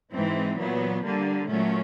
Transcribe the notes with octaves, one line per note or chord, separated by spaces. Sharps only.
G#2 E3 G#3 C4
A#2 F#3 B3
D3 G3 A#3
A#2 F#3 A3 C#4